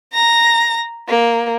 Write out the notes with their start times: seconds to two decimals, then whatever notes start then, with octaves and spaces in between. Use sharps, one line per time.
0.13 A#5 A#6
1.08 A#3